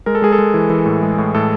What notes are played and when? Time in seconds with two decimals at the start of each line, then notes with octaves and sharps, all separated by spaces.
0.06 G#3 A#4
0.15 A4
0.22 G#3 G#4
0.32 A4
0.38 G#3
0.54 E3
0.70 E3
0.86 A2
1.03 G#3
1.18 A2
1.35 A2 A4